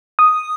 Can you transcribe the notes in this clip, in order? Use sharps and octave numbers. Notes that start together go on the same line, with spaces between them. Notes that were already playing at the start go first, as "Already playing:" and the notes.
D#6